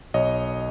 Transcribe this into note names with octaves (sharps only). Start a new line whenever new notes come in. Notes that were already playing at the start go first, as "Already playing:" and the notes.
B1 C#5 D#5